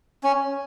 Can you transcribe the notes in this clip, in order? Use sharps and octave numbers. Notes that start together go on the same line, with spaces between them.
C#4